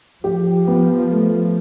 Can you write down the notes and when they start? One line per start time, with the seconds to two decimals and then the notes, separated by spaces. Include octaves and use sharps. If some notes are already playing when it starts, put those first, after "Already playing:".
0.24 F3 G4
0.67 B3
1.10 A3